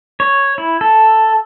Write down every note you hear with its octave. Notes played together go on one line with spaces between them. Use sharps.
C#5
E4
A4